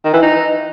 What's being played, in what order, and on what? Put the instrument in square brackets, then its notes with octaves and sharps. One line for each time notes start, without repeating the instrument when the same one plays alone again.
[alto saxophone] D#3
E3
D#4